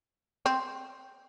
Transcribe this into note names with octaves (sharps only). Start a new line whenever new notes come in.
C4